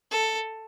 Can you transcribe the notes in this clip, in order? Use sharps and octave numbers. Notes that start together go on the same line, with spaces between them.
A4